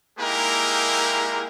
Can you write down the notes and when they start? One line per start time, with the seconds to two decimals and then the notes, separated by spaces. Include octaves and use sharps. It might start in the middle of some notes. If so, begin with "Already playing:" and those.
0.19 G#3 A#3 D#4 E4 G4 A#4